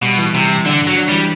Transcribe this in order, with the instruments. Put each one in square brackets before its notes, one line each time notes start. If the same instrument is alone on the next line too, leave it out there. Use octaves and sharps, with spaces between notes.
[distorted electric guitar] B2 [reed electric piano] G3
[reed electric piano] E3
[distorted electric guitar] C3 [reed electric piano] G3
[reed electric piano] E3
[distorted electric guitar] D3 [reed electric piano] D4
[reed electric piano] G2
[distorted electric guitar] F#3
[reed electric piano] D4
[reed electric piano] E3 [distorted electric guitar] G3